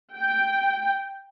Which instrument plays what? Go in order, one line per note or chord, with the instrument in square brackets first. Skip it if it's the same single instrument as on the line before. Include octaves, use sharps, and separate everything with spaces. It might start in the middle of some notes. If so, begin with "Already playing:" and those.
[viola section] G5